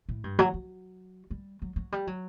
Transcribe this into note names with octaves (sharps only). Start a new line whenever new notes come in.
A2
G2
F#3
F#3
G3
F#3
F#3
G3
F#3